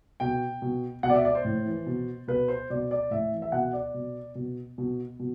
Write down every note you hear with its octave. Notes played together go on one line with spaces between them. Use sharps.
B2 G5
B2
B2 F#5
D5
E5
D5
C5
A2
E3
B2
B2 B4
C5
B2 D5
D5
A2 E5
E3
E5
B2 F#5
D5
B2
B2
B2
B2